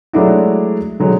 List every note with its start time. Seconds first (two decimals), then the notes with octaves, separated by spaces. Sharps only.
0.13 F#3 G#3 A3 D4 E4 F#4
1.00 D3 F#3 G#3